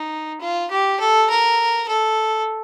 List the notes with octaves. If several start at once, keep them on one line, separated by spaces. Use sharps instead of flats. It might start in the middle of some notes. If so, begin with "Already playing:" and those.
Already playing: D#4
F4
G4
A4
A#4
A4